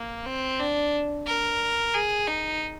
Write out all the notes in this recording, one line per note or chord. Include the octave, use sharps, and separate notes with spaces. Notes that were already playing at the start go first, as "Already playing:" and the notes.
Already playing: A#3
C4
D4
A#4
G#4
D#4